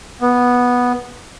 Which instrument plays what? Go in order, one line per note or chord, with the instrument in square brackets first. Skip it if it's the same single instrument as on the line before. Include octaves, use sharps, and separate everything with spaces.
[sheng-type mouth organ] B3